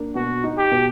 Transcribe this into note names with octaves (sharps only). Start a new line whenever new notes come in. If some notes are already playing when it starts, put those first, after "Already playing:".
Already playing: A#3 D4
B2 F#4
D#4
G4
B2